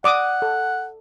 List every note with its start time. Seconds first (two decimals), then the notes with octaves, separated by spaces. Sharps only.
0.04 D5 F#5 D6 D#6
0.42 A4